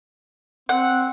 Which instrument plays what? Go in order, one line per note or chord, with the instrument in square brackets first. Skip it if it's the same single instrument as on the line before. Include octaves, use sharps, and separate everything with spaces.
[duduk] C4 [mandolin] F#5